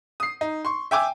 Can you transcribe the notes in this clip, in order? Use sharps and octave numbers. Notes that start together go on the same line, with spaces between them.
D#6 C7
D#4
C6 C#6
E5 G5 G#5 D6 E6